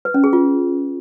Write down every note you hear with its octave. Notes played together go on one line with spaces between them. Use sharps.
B4
C#4
G#4
F4